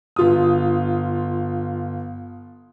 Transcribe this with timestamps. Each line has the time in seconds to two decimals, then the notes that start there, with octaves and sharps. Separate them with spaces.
0.16 G1 F4 D#6